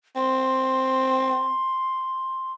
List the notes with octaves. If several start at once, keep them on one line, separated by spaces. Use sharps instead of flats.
C4 C6